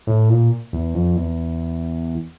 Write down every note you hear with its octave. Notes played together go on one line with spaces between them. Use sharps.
A2
A#2
E2
F2
E2